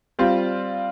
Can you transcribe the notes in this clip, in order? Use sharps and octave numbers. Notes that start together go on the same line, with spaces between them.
G3 C4 F4